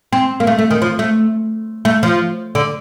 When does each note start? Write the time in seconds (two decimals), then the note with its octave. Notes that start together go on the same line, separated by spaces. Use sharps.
0.13 C4
0.40 A#3
0.47 A3
0.58 A3
0.70 D#3
0.82 F3
0.99 A3
1.85 A3
2.03 F3
2.55 D3